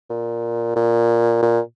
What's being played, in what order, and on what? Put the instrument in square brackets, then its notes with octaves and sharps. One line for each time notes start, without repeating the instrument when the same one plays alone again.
[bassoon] A#2
A#2
A#2